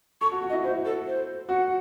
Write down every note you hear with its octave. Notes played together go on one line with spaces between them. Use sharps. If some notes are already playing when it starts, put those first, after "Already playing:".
A4 C#6
F#4
F#4
D#5
E4
E4 C5
A4
C5
F#4 F#5